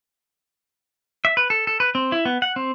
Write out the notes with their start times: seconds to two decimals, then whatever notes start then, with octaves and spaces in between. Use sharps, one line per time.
1.25 E5
1.37 B4
1.50 A4
1.67 A4
1.80 B4
1.95 C4
2.12 E4
2.25 B3
2.42 F#5
2.56 C4